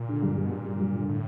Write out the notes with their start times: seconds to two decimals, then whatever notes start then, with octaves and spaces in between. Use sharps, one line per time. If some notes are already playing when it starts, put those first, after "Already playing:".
Already playing: A#2
0.09 D3
0.23 G2
0.37 G2
0.44 B2
0.51 G2 A#2
0.66 G2
0.80 G2
0.94 D3
1.09 A2